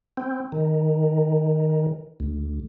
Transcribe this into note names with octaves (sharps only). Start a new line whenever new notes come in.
C4
D#3
D2